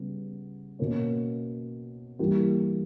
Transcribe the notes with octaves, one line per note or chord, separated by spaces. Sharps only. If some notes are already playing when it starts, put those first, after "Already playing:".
Already playing: C#3 G3 B3
B2 A#3 C#4
G2 E3 A#3 E4 G4